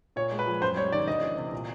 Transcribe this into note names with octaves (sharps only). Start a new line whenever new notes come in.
A#2 C#5
G#3
B4
F3
F#2 C5
G3 C#5
D#3 D5
D2 D#5
E3
C3
A#2